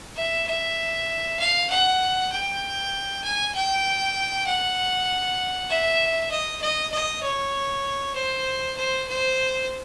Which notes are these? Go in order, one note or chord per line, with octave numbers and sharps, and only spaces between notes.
E5
E5
F5
F#5
G5
G#5
G5
F#5
E5
D#5
D#5
D#5
C#5
C5
C5
C5